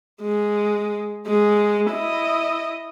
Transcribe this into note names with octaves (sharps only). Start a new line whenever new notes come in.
G#3
G#3
E4 D#5